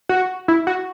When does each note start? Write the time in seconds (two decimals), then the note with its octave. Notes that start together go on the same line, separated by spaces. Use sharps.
0.09 F#4
0.48 E4
0.67 F#4